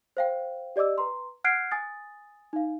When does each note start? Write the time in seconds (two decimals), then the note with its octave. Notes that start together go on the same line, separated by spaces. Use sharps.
0.17 C5 F5 G5
0.76 G4 D5 D#5 D6 E6
0.98 B4 A#5 C6
1.44 F#5 F6 F#6 G#6 C7 D7
1.71 G#5 D#6 A6
2.53 D#4 F5